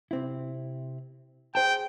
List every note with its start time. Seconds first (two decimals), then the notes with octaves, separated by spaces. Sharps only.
0.11 C3 C4 E4
1.55 G#4 C5 G5 A5